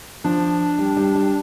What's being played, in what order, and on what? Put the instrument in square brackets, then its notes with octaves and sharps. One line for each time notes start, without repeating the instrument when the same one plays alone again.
[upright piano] F3 [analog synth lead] D4
[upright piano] G3
G3
G3